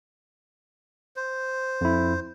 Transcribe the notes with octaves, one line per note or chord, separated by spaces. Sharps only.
C5
F2 E4